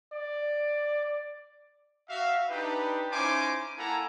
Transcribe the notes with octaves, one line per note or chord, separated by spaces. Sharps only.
D5
F#4 E5 F5
D4 D#4 G4 B4
C#4 D#4 E4 C5 G#5 D6
A#3 E4 A4 F#5 G#5 A#5